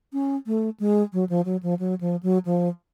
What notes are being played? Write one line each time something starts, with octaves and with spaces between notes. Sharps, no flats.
C#4
A3
G#3
F#3
F3
F#3
F3
F#3
F3
F#3
F3